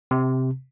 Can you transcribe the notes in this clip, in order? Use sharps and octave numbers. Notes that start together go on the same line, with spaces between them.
C3